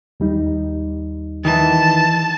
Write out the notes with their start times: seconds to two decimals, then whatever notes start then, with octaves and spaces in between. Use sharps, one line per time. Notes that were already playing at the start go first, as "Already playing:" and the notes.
0.20 D#2 G3 D#4
1.45 D#3 E3 A5